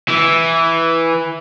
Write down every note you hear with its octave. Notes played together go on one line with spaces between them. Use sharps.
E3